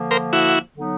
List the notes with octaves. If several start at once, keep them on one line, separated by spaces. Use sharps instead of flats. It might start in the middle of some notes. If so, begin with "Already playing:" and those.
Already playing: D3 F3 A#3
A#4 C5
E4 F#4
D3 F#3 B3 D#4